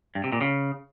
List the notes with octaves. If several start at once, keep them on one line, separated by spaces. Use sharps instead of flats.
G2
C3
A#2
C#3